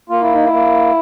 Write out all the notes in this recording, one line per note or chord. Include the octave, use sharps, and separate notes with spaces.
A#3 F4
E4
D#4
E4
A#3